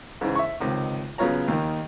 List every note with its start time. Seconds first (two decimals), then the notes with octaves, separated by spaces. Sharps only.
0.21 G#2 C#3 E3
0.35 E5 C#6
0.60 C#2 C3 D#3
1.18 C#3 F#3 B3 F4 C#5 A#5
1.48 D#2 D#3